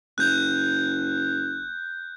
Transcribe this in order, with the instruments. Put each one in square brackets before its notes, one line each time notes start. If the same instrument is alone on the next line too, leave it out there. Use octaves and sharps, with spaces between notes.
[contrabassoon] F#1 [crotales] F#6 G6